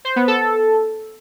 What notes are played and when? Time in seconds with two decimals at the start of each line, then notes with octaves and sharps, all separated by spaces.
0.05 C5
0.16 B3
0.28 A4